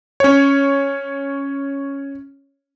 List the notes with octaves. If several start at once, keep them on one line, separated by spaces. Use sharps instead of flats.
C#4 C#5